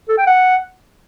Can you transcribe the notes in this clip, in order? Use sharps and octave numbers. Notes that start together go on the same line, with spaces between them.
A4
G5
F#5